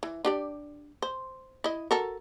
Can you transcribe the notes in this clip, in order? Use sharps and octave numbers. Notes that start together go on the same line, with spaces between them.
E3
D4 G4 D5
C5
E4 D#5
F#4 A4 A#4